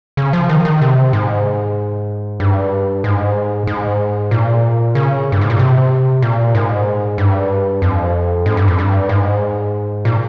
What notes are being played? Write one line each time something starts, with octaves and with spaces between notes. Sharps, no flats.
C#3
F3
D#3
D#3
C3
G#2
G2
G#2
G#2
A#2
C#3
G2
G#2
A#2
C3
A#2
G#2
G2
F2
G#2
G2
F2
G2
G#2
A#2